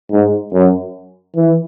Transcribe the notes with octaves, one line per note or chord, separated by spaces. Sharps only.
G#2
F#2
E3